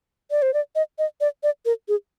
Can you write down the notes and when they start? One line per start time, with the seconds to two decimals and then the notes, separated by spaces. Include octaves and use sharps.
0.31 D5
0.42 C5
0.54 D5
0.75 D#5
0.99 D#5
1.21 D5
1.43 D5
1.65 A#4
1.88 G#4